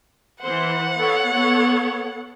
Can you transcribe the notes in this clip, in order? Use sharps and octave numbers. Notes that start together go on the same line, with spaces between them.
E3 C5 F#5
B3 A4 C#5
B3 A4 C#5